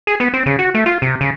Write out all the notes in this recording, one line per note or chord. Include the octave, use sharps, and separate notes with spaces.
G#4
B3
C4
C#3
F#4
A3
F4
C3
C#3